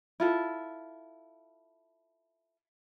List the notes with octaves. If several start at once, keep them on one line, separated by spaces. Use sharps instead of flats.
E4 F4 A4